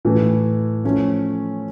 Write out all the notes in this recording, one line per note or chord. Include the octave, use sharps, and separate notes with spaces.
A2 E3 A3
F3 A3 C#4